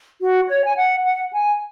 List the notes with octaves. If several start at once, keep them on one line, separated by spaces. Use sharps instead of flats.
F#4
C#5
G#5
F#5
F#5
G#5